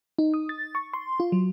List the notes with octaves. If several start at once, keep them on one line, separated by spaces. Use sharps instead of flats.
D#4
D#6
A6
C#6
C6
F4
F#3